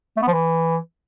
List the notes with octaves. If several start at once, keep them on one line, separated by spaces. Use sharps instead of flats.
A3
B3
F3
E3